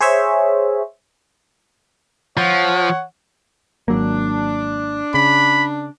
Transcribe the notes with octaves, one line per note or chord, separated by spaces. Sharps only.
G#4 C5 C#5 E5
F3 C#5 F#5
G#1 F#3 A#3 D4
C#3 B5